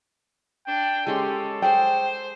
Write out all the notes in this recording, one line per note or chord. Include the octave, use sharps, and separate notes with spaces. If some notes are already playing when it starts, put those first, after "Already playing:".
D4 G5
G#3 C#4 G4 A4 C6
G#4 C5 G5